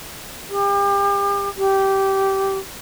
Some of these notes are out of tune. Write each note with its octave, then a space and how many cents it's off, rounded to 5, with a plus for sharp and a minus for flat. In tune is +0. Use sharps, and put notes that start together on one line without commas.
G4 +35
G4 -15